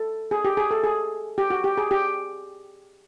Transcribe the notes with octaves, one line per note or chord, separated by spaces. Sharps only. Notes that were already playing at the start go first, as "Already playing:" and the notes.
Already playing: A4
G#4
G4
G#4
A4
G#4
G4
F#4
G4
G#4
G4